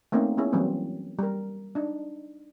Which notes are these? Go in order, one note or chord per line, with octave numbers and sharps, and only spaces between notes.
A3 A#3 C4 C#4 D#4
B3 C#4 E4 G#4
E3 F#3 G3 A#3 C4 C#4
G3 A#4
D4 D#4